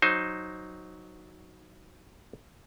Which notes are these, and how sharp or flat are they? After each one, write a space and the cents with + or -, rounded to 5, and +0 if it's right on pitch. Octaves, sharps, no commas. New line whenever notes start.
F#3 +0 D#4 +0 C5 +10